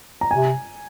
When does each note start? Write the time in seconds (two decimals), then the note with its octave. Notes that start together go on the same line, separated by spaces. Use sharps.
0.21 A#5
0.31 C3 G#5